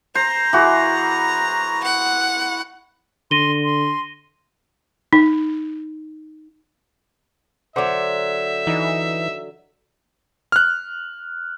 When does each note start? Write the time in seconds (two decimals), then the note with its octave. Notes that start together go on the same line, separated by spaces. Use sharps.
0.15 C5 A#5
0.53 E3 F#4 G#4
1.84 F#5
3.31 D3 C6 A#6 D#7 G7
3.64 C6
5.13 D#4
7.76 D3 F#3 C5 E5 F#5 D6
8.67 E3 D#4
10.52 F6 F#6